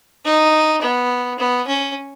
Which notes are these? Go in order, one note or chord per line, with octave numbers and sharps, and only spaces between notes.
D#4
B3
B3
C#4